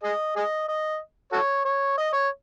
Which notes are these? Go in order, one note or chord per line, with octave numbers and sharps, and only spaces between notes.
G#4 D#5
G#4 D#5
D#5
F#4 A4 C#5
C#5
D#5
C#5